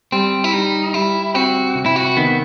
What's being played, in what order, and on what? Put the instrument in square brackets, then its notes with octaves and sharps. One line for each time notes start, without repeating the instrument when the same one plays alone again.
[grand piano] G3 [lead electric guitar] C4
[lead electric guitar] E4
[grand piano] G3 [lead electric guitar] D#4
[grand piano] G3 [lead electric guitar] E4
[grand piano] C4 [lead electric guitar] F#4
[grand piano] C3
[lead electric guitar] E4
F#4
[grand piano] D#3 [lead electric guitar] B3